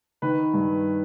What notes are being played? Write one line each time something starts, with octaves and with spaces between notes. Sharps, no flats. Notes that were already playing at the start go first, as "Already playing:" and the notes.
D#3 B4
G2